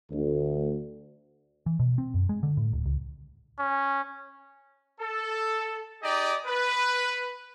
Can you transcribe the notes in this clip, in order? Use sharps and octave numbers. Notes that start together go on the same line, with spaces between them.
D2
E3
B2
C4
F#2
G#3
D3
A2
D1
C#2
C#4
A4
D#4 G4 G#4 D5 D#5
B4